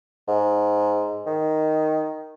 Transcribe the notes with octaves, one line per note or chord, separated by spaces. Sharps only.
G#2
D#3